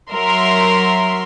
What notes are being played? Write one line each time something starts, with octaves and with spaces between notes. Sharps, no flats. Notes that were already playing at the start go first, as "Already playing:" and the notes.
F#3 A#4 E5 C6